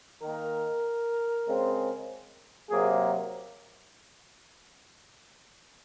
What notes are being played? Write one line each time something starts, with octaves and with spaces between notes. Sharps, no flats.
D#3 A#3 A#4
C#3 G#3 C4
C3 F#3 A#3 G#4